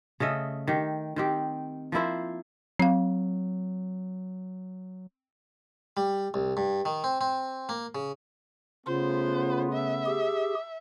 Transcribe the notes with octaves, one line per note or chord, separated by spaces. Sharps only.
C#3 A3 D#5 E5
D#3 G4
D#3 C4 G4
F3 A#3 E4 C5
F#3 C4 F5
G3
C2
G2
D#3
C4
C4
A#3
C#3
C#3 A3 B3 F4 C5
E5
G4 G#4